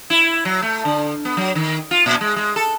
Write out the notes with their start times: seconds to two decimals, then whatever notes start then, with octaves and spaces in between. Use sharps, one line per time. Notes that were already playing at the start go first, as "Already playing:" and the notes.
0.10 E4
0.45 F#3
0.62 A3
0.85 D3
1.25 B3
1.37 F#3
1.55 D#3
1.91 F4
2.06 A#2
2.21 G#3
2.36 G#3
2.56 A4